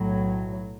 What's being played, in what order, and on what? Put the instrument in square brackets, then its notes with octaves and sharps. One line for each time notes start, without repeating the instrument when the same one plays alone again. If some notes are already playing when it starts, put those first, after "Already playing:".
Already playing: [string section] B1 A2 F#3